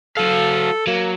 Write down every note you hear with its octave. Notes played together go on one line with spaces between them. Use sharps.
F#3 A4 F5
F#3 A#3